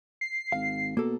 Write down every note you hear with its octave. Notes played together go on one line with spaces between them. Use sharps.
C7
G#1 F5
B2 A#3 A4